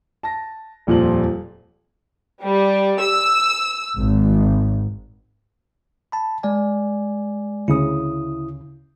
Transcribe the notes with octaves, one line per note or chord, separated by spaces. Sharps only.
A5 A#6
D#1 F2 A#2 C5 F#7
G3
E6
G#1
A5 B5
G#3 D5 G#5
D2 C#3 E4 D#6